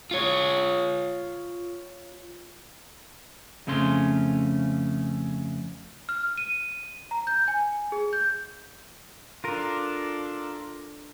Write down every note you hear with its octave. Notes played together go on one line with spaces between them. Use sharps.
F4 C#5
F2 C#3 A3 C#4 C6
F6
D#7
A#5
G6
G#5
G#4
G6
D4 F4 A4 A#4